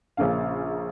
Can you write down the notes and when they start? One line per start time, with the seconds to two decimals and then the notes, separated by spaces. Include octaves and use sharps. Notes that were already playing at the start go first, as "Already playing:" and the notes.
0.17 A#1 C#3 A#3 C#4 F5